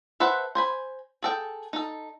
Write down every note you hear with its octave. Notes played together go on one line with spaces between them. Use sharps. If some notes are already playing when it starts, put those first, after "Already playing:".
A4 B4 C5 E5 F#5
C5 G#5 B5
G#4 A4 G5
D#4 A4